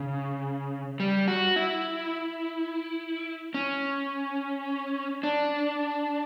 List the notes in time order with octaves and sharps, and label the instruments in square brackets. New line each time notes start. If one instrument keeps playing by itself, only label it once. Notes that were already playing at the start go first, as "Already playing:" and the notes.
Already playing: [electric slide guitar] C#3
G3
F#4
E4
C#4
D4